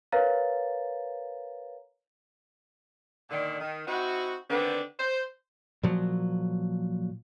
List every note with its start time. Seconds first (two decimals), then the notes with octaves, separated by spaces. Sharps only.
0.12 A#4 B4 C#5 F5 A#5 A6
3.30 A#2 D3 D#3
3.60 D#3
3.87 C4 D#4 E4 F#4
4.50 D3 D#3 B3 C4 D4 B4
4.98 C5
5.83 A#2 F3 F#3